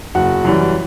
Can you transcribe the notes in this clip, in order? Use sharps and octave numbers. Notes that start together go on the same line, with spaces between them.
F#1 F#4 F#5
F#2 E3 G3